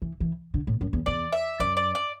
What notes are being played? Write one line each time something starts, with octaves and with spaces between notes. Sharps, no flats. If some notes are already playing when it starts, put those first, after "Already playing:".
E3
E3
D3
A2
F#2
E2
E2 D5
E5
F#2 D5
D5
D5